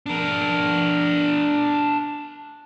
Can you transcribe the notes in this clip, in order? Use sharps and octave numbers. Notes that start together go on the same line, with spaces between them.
D4 A#4